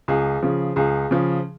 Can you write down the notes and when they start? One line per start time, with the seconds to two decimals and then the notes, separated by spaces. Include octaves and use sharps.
0.08 C#2 G#4
0.43 C#3 F3
0.76 C#2 G#4
1.11 C#3 F3